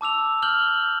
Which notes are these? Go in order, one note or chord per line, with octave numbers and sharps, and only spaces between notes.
A5 D6 E6 F7
F6 G6 F#7 G7